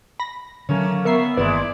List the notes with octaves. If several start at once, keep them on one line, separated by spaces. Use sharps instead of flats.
B5 A#6
D3 D#3 F#3 A3 A#3 C#4
B3 A#4 E5 C#6 C7
G1 E2 D#3 G#3 A#3 E4 B4 D5